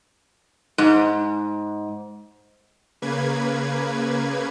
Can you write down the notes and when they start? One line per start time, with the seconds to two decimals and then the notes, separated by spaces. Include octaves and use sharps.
0.78 G#2
3.02 C#3 A#3 B4 G#6